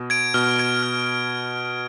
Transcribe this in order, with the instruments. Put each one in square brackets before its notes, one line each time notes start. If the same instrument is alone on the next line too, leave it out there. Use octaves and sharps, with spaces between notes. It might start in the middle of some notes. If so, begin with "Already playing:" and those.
Already playing: [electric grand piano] B2
[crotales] G#6 D7
[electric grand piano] B2 [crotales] F6
[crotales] G#6 D7
F6